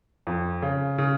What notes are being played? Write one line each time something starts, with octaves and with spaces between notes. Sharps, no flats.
F2
C#3
C#3